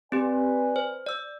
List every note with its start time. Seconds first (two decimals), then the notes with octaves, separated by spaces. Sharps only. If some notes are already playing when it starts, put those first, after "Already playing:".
0.12 C4 G4 B4 D5 G#5
0.76 C5
1.06 D5 E6